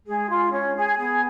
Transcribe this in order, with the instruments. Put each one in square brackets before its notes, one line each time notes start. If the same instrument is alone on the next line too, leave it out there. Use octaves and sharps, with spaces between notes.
[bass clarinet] G#3 [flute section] G#4
[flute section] F4
C#4
G#4
[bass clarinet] B3 [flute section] G#4